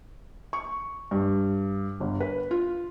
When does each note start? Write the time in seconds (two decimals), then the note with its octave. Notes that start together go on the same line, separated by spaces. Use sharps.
0.53 C#6
1.11 G2
2.00 G1
2.20 B4
2.51 F4